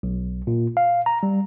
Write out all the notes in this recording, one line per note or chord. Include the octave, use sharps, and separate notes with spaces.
B1
A#2
F5
A#5
G3